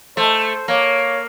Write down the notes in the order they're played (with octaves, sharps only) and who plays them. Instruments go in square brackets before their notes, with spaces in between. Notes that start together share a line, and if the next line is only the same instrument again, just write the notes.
[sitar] A3 [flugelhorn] C5
[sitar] A#3 [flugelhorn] C#5